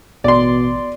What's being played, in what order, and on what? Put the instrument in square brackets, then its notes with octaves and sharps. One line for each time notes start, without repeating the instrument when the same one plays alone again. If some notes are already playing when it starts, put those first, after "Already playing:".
[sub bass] A1 [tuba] B2 [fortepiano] D5 C6